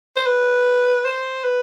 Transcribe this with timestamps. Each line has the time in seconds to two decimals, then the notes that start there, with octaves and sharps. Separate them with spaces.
0.16 C5
0.26 B4
1.05 C5
1.44 B4